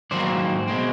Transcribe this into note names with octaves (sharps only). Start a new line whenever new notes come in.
G#2 D#3 F#3 A#3 C5 D5
B2 G#3 C4